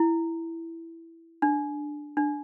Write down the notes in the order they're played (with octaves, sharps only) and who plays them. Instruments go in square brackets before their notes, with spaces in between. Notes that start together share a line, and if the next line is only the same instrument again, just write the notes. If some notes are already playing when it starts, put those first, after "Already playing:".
Already playing: [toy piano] E4
D4
D4